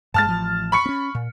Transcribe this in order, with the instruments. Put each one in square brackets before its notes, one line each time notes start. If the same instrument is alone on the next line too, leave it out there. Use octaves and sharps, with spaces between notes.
[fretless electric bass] G2 G#3 [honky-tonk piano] A5 F6 A6
[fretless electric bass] A1 F3
[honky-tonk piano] B5 C#6 C#7
[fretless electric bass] C4 C#4
A#2